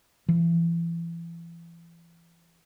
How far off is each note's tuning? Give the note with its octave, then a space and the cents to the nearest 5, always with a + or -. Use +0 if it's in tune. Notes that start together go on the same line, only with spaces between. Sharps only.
E3 +35